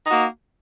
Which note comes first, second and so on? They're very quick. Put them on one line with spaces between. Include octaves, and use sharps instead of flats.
D#4 F#4 A#3